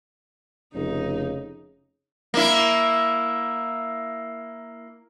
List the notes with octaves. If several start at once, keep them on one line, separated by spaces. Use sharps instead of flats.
F1 C#3 D#4
A#3 E4